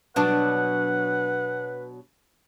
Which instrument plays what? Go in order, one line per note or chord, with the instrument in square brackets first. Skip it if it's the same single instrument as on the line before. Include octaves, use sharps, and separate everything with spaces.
[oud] B2 F#3 D4 [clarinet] B4 [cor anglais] F#5